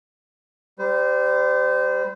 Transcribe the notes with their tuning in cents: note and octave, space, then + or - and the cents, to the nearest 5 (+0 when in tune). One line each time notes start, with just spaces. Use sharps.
G3 +5 C5 -30